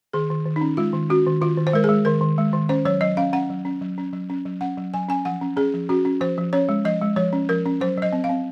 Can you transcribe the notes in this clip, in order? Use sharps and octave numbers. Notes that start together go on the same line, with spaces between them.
D#3 G#4
D#3
D#3
D#4
C#4
G#3 F4
D#3
C#4 F#4
D#3
D#3 F4
D#3
C5
G#3 A#4
G#4
G#3
D#3 A#4
D#3
G#3
D#3
C#4 C5
F#3 C#5
F#3 D#5
C#4 F5
C#4 F#5
F#3
C#4
F#3
C#4
F#3
C#4
F#3
C#4 F#5
F#3
F#3 G#5
C#4 G#5
F3 F#5
C#4
C#4 G#4
F3
C#4 F#4
C#4
F3 C5
F3
C#4 C#5
G#3
F3 D#5
G#3
F3 C#5
C#4
F3 A#4
C#4
F#3 C5
F#3 D#5
C4
F5
C4